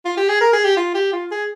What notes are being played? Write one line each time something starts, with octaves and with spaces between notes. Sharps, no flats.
F4
G4
G#4
A#4
G#4
G4
F4
G4
F4
G#4